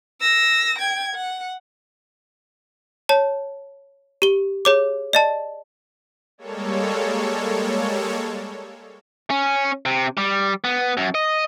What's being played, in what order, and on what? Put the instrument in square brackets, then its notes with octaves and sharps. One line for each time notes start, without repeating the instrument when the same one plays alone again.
[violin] E6 A#6
G5 G#6
F#5
[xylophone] C#5 A5
G4 G7
G#4 C#5 D6
D5 D#5 A5
[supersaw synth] G3 G#3 A#3 A4 C#5
[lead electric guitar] C#4
C3
G3
B3
F#2
D#5